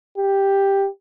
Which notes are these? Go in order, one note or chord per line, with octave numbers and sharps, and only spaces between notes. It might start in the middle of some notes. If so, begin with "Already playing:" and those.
G4